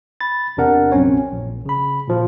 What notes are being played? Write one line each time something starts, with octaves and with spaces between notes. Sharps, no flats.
B5 A6
E2 C3 D4 A#4 F#5
A#1 F#2 C4 C#4 C#5
A#1
C#3 B5
A#2 F3 F4